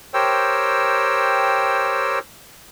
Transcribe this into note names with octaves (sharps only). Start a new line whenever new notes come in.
G4 A#4 C5 C#5 G5 E6